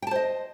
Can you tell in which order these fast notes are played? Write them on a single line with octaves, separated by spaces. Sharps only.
G5 A5 C5 D#5